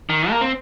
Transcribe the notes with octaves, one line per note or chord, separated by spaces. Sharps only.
D#3
A#3
C4